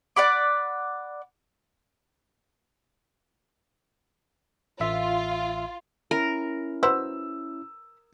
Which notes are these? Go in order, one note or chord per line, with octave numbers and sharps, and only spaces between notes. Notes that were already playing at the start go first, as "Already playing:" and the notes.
D5 F#5 B5 D6
A1 F4 E5
C#4 E4 A#4
F#4 B4 C5 E6